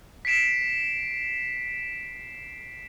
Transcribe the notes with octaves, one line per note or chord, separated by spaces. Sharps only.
B6 C7 D7 E7